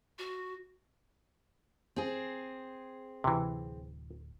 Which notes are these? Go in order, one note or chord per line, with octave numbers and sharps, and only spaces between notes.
F#4
C4 G#4
D1 C3 E3